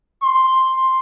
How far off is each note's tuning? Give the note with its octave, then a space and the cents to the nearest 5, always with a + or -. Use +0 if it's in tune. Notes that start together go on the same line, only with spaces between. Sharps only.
C6 +5